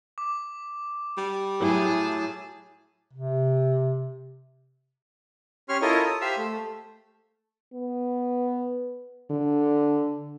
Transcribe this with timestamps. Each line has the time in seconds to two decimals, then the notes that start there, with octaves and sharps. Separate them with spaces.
0.18 D6
1.17 G3
1.60 A2 F#3 G#4 A5
3.14 C3
5.69 C#4 G4 C#5 C6 C#6 F6
5.82 E4 F4 A4 A#4 C#5 D#5
6.06 D#6
6.21 G4 C5 E5 F5 E6
6.38 A3
7.74 B3
9.30 D3